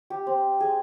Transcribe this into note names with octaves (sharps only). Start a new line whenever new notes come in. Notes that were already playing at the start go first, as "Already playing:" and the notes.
G4
C4
G#4